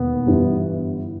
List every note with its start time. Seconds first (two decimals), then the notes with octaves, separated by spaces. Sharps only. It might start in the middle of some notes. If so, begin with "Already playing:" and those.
Already playing: E1 D#2 D#3 B3
0.27 G1 G2 E3 G3